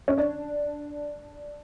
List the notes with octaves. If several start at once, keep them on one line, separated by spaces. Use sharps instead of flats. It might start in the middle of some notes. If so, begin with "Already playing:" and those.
C#4
D4